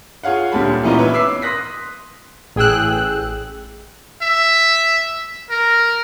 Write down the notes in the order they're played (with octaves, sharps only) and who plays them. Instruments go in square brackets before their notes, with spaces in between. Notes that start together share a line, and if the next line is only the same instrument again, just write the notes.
[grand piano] F4 G#4 C#5 F5 F#5
D2 A#2 G3 A5 B5
A#2 E3 B3 C#4 D#4 F4
B4 C#5 E5
D6 E6 B6 C7
C6 D#6 F#6 A#6 B6
[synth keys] A1 G#4 G5 E6 F#6
[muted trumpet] E5
A#4